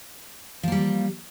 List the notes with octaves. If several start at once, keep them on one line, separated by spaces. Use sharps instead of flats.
F3 G3 A#3